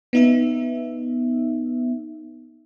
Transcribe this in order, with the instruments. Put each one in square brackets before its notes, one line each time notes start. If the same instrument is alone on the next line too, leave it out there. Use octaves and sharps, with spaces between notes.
[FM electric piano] B3 D#4 E5